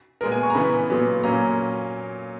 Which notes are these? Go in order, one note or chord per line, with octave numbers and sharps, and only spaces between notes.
A#2 G#3 B3 A#4
G#5
C#6
A#5
C#3 E3 B3 B5
A#2 F#3 B3
A#2 F#3 A#3 C#4 A#5